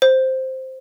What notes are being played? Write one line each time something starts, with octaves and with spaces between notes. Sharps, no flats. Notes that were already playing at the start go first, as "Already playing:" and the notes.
C5